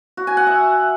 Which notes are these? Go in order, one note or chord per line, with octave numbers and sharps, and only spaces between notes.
F#4
G#5
F#5
E5